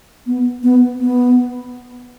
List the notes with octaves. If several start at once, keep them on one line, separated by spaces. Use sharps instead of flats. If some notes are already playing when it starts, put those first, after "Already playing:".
B3
B3
B3